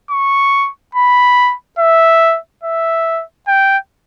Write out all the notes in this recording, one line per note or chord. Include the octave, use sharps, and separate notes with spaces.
C#6
B5
E5
E5
G5